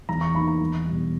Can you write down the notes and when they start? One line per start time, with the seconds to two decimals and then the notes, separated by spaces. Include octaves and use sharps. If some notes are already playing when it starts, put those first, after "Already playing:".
0.09 E2 A#5
0.21 C#6
0.34 D#3 A#3 B5
0.47 A#5
0.61 E2
0.87 B2 G3